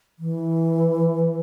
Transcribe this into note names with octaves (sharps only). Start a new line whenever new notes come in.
E3